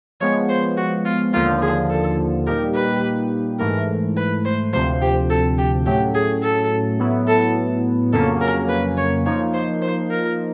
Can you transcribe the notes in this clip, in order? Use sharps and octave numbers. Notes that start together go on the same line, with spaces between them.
F3 G#3 B3 C#5
C5
F#4
F4
D#2 D3 F3 A#3 F4
G#4
A4
A#2 G3 A#3 D#4 G4 A#4
B4
G#2 E3 A3 A#4
B4
C5
D2 C3 F3 C5
G4
A4
G4
A2 F#3 A3 C#4 G4
G#4
A4
A2 F#3 B3 E4
A4
F2 C#3 F#3 A#3 C#4 A4
A#4
B4
C#5
F3 A#3 D#4 C#5
C5
C5
A#4